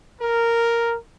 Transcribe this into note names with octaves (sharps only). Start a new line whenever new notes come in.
A#4